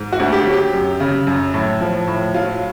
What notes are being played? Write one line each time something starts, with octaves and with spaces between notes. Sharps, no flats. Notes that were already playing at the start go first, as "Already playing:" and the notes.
Already playing: G#2
F#4
D2
G4
F#3
G4
F#2
C#3
F#2
A2
F3
A2
F#3 F4